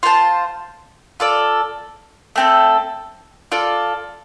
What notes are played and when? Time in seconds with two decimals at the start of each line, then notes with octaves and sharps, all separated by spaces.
0.03 F4 C5 A5
1.20 F4 A4 D5
2.36 A3 C4 A4
3.52 F4 A4 D5